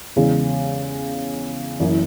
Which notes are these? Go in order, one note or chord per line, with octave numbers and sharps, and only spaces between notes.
E2 C#3 G#3
F#1 F#2 E3